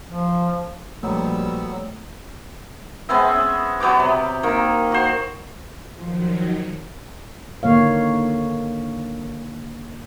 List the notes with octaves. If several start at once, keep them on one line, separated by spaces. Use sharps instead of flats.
F3
A#1 F#3 G3 A3 B3 E6
G#3 B3 C4 E5
C#4
F#3 B3 G4 D6
C3
D#3 A#3
F#4 C5
D#3 F3 F#3
D3 D#3 A#3 C#5 F5